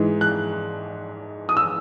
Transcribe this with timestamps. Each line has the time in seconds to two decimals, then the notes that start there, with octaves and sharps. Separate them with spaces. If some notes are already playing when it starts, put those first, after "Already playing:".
Already playing: G#2 E3 G#3
0.21 F#6
1.49 D#6
1.57 E6